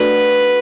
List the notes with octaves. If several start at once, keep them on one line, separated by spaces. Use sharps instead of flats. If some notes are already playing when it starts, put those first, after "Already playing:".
Already playing: A3 D4 F#4 A4 B4